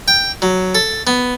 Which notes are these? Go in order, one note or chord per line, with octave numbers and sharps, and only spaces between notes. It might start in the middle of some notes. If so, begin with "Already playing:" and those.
G5
F#3
A4
B3